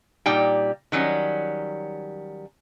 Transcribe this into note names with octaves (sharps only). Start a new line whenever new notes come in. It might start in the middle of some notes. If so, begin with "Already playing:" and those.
A#2 G3 D#4 G5
D#3 F#3 G3 C#4